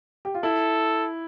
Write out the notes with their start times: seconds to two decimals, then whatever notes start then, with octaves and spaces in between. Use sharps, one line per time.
0.25 G4
0.34 F4
0.43 E4 A4